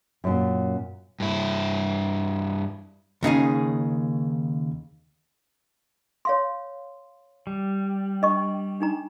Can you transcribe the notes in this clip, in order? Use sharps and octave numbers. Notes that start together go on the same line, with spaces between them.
F#2 A#2
G2 E4
D#2 C#3 D#4 G#4
C#5 F5 C6
G3
D4 D#5 C#6
D4 D#4 A#5